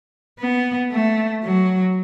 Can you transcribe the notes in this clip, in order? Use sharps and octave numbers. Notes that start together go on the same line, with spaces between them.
B3
A3
F#3